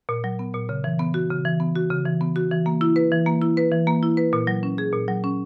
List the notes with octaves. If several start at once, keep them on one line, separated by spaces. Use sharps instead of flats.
A#2
F#3
B3
A#2
C#3
E3
B3
F#4
C#3
E3
B3
F#4
C#3
E3
B3
F#4
E3
A#3
E4
B4
E3
A#3
E4
B4
E3
A#3
E4
B4
A#2
F#3
C#4
G#4
A#2
F#3
C#4